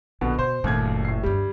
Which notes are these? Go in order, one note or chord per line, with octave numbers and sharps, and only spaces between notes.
A#1 B2 D3 B3
B2 C5
F#1 D#2 A#2 A3 G#6
A2 C7
D2 G2 G3